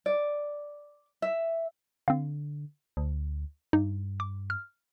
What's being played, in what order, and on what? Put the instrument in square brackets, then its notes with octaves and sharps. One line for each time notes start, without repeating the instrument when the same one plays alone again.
[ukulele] D5
E5
[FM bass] D3 [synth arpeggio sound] C4 F5
[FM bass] D2
[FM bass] G2 [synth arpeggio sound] D#4
[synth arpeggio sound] D6
F6